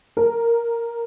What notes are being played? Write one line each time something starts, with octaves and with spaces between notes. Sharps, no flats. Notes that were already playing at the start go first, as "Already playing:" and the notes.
A#4